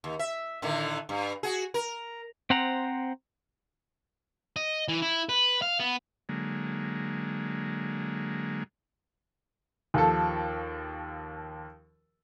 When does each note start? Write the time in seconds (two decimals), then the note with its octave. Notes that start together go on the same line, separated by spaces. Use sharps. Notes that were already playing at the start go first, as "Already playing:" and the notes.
0.04 D#2
0.19 E5
0.62 A2 D3 D#3
1.09 G2
1.43 F#4 G#4
1.74 A#4
2.50 C4 C5 F#5 A#5
4.56 D#5
4.88 E3
5.02 E4
5.29 B4
5.62 F5
5.80 B3
6.29 D3 F#3 G#3 A#3
9.94 D#2 F3 A4